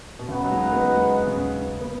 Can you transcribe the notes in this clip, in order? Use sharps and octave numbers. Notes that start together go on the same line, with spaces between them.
B2
C#3 D#4 B4 D#5 F#5
F#3
G#3
B3
G#3
C#3
B3